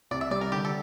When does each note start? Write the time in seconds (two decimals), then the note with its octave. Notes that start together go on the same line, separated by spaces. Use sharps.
0.11 C2 D5
0.21 E5
0.31 G3 D5
0.41 A#4
0.52 D3 G4
0.65 A4